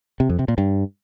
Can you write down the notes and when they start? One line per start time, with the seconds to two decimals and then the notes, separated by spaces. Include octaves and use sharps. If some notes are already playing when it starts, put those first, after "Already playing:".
0.20 C3
0.29 F2
0.39 C3
0.48 A#2
0.58 G2